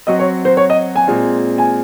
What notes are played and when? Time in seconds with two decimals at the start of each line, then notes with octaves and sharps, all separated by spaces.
0.07 F#3 C4 F#4 D#5
0.19 C#5
0.45 C5
0.57 C#5
0.70 D#5
0.95 G#5
1.08 A#2 G#3 C4
1.58 G#5